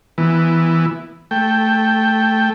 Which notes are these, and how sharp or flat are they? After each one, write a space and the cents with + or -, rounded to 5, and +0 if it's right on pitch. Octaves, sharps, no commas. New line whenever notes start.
E3 +0 B3 +0
A3 +0 G5 +0